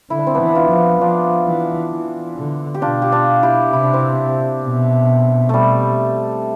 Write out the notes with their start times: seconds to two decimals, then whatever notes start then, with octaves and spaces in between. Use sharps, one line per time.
0.10 D3 E4
0.19 D4
0.27 C4
0.34 B3 D4
0.40 E3
0.55 D4 F4
0.71 F3
1.00 F3 D4 F4
1.46 E3
1.92 E3
2.37 D3
2.74 G4
2.82 B2 D4 F4
3.02 G4
3.12 D4 F4
3.43 E4 G4
3.73 C3 E4
3.83 D4
3.93 C4 E4
4.63 B2
5.49 G3 A3